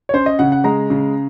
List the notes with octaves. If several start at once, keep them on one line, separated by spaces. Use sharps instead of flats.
C#5
C#4 C5
D#5
C#3 F#5
F#5
G#3 A#5
C#3